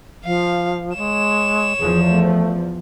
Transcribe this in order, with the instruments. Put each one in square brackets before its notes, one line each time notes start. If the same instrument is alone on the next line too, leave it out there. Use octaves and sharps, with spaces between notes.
[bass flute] F3 [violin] F5
[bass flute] G#3 [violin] C#5 E7
[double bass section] E2 F3 [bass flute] G#4
[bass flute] A3